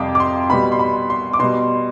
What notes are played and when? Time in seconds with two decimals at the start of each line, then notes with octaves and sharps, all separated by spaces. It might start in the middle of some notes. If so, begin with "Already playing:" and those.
Already playing: F2 C3 G3 F5 G5 D6
0.15 D6
0.20 C6
0.50 B2 G3 B5
0.72 C6
0.79 B5
1.10 C6
1.33 D6
1.39 B2 G3 C6